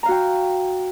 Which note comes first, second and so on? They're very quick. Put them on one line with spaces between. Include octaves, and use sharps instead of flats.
A#5 F5 F#4 G5